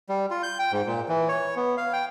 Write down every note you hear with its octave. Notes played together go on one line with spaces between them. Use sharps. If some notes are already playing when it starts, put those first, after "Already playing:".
G3
F4
G6
G5
G#2
A#2
E3
C#5
B3
F5
G5